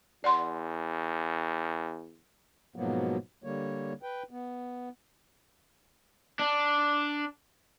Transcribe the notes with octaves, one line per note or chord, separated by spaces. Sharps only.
E2 D5 F#5 C6
G#2 B2 F3 F#3 A#3 B3
D3 G3 A#3 C#5
B4 G5
B3
D4